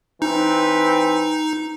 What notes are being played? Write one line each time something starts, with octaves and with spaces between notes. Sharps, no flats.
E3 C4 D#4 B4